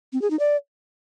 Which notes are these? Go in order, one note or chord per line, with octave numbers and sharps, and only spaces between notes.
C4
G#4
D#4
D5